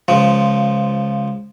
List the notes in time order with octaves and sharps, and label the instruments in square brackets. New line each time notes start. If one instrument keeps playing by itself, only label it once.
[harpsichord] C#2 F3